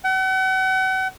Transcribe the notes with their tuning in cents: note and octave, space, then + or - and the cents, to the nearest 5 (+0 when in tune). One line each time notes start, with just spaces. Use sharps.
F#5 +40